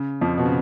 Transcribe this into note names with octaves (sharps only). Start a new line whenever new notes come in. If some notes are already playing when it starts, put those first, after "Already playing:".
Already playing: C#3
F2 F3
B2
C#3